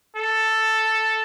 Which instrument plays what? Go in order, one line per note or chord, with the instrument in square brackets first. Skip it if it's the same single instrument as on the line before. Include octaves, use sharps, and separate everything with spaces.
[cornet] A4